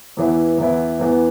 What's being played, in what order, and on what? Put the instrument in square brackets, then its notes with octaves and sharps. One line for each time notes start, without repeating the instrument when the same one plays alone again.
[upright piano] E2 E3 B3 E4
E2 E3 B3 E4
E2 E3 B3